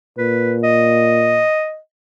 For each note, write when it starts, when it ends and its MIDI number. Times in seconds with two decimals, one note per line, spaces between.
0.18 1.46 46
0.18 0.58 71
0.63 1.78 75